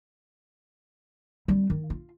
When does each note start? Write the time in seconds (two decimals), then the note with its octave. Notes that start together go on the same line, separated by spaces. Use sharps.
1.48 G3 C4
1.70 D#3
1.90 F4